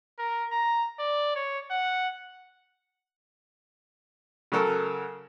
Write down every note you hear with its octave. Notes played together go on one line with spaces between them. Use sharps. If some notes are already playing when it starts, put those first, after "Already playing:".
A#4
A#5
D5
C#5
F#5
C#3 F#3 A4 A#4